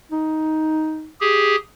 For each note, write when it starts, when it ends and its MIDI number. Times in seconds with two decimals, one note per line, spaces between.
0.12 1.10 63
1.20 1.56 67
1.20 1.56 68